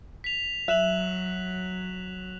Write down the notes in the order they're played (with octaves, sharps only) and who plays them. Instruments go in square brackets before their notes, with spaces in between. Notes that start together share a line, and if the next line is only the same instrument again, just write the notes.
[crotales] B6 F7
[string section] F#3 [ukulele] E5 [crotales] F#6 E7 F#7